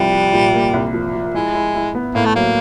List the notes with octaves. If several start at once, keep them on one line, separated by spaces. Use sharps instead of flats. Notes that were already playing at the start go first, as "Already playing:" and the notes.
Already playing: C2 F3 G3
F3
A#2
A#3
C2
F3
F3
G#3 E4
E4
E4
B3
A2 A#3
A3
F#3 A#3